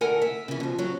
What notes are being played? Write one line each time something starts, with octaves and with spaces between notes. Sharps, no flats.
D2 E4 A4 A#4 F#5 G#5
E5
C#3 E3
B2 F3
C#3 F#3